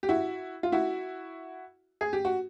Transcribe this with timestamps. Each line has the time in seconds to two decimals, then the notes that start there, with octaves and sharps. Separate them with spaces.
0.03 G4
0.09 E4 F#4
0.63 F4
0.72 E4 F#4
2.01 G#4
2.13 G4
2.25 F#4